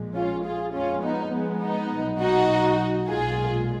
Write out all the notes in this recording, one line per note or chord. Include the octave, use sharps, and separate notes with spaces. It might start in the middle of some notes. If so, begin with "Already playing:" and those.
Already playing: A#1 A#2 F3 G#3
C#4 F4
F4 G#4
F2 F3 G#3 C#4 F4
B3 D#4
G#3 B3
B3 D#4
B1 A#2 F#3
D#4 F#4
B1 A#2 G#3 F4 G#4